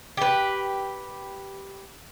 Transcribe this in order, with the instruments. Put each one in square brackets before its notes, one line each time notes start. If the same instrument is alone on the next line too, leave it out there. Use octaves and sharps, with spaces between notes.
[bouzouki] G4 B4